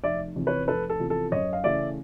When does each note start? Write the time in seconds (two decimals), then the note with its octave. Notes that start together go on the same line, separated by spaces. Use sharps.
0.04 F1 D5 E5
0.36 E2 C3 F3
0.47 B4 C#5
0.67 F1 A4 B4
0.90 A4
1.00 E2 C3 F3
1.10 A4
1.32 F#2 C#5 D#5
1.53 F5
1.63 C#3 E3 A3 D5 E5